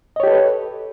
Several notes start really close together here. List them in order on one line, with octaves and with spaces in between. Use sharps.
D#5 C#5 G4 A4 B4